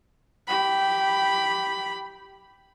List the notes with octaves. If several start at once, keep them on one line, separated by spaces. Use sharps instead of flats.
G4 B5